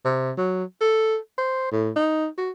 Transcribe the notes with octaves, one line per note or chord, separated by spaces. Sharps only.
C3
F#3
A4
C5
A2
D#4
F#4